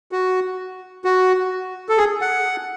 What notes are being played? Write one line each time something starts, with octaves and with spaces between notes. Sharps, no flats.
F#4
F#4
A4
G#4
F#5